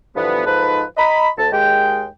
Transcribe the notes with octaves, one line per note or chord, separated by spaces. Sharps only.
G2 D3 E3 F3 B3
G#2 F3 D#4 A4 B4
D#5 A#5 B5
D2 A5
D#2 G#3 G5